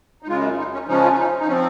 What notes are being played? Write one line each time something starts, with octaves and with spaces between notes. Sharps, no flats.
D#4
F#2 C#3 G#3 F4
D#4
C#4
C#3 F3 G#3 C#4 D#4
F4
C#4
D#4
D#4
F3 C4 C#4